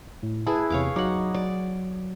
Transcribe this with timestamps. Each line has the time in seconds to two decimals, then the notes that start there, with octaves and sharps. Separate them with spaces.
0.23 A2
0.47 E4 G#4 B4 A5
0.70 E2 C3 C#5 F5 D6
0.96 F#3 D#4 F#5 D6
1.34 F#3 D5